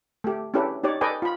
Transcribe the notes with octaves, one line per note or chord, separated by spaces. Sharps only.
A3 G4
C#4 D4 E4 G4 A4 B4
D#4 G4 C#5 D5
A4 B4 D5 D#5 G5 G#5
F4 B5